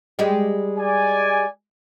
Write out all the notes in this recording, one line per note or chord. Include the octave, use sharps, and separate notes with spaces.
G3 G#3 G4
D5 G#5